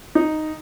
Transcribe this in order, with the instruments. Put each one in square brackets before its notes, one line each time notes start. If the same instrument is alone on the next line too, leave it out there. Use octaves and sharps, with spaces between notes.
[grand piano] D#4